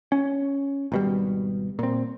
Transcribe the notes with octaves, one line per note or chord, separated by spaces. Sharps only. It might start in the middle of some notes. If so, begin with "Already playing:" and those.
C#4
G#1 B2 G3
A#2 C4